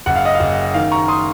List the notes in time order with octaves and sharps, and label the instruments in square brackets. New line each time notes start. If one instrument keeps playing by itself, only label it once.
[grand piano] F#1 F#5
F5
D#5
F5
F#1
D#3 F5
A#5 C#6
C6 D#6